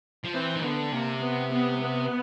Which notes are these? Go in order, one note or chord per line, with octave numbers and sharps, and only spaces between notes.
F3
E3 C4
D#3
D3 B3
C3 A#3
B3
B3
B3